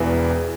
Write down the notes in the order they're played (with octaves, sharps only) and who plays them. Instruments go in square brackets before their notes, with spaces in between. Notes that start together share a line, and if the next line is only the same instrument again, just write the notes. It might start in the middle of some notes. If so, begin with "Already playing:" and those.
Already playing: [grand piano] E1 E2 E3